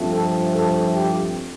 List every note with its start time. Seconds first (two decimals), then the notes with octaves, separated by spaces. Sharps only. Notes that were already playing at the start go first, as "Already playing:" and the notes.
Already playing: G2 F3 A3 C4
0.12 A4
0.53 A4
0.95 G4